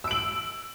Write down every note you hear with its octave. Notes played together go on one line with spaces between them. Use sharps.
E6 D7 F#7